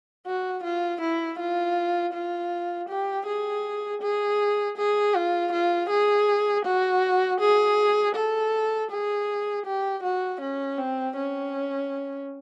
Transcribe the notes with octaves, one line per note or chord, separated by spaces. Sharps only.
F#4
F4
E4
F4
F4
G4
G#4
G#4
G#4
F4
F4
G#4
F#4
G#4
A4
G#4
G4
F#4
C#4
C4
C#4